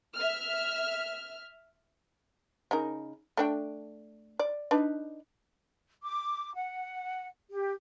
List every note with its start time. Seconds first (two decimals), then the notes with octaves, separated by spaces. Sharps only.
0.15 E5 F6
2.71 C#3 D#4 A#4
3.37 A3 D4 G5
4.39 D5
4.71 D4 D#4 B4
6.04 D6
6.54 F#5
7.50 G4